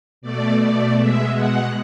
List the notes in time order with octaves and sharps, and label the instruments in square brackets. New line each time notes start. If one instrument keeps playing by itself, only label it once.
[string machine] B2 A3 D5
D5
B2 G#3 E5
F#5